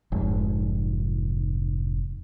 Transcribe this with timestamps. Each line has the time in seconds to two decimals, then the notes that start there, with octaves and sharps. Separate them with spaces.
0.12 F1 G#2